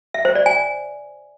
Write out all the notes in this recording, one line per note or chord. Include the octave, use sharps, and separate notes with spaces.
E5
C5
D5
G#5